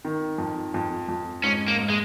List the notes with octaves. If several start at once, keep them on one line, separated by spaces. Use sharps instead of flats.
D#3
F2
F2
F2
G#2 C#4
A#3
G#2
G#3